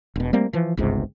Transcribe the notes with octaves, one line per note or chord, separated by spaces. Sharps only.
E1 B2
G3 A3 A#3 C4
E3 F3
G1 C#2 G#2 C3